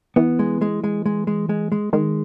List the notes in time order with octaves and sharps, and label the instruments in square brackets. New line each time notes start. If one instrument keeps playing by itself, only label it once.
[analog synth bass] E3 [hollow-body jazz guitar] B3
[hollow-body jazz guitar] G#3
G#3
G#3
G#3
G#3
G#3
G#3
[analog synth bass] D#3 [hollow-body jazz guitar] G#3